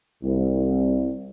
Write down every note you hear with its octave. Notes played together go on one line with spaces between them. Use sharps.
C2